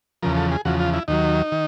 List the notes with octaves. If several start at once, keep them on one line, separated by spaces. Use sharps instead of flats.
E2 C#3 F3 A#4
A4
G#4
E2 C#3 F3 F#4
F4
E4
D#2 D#3 F#3 D#4
D#3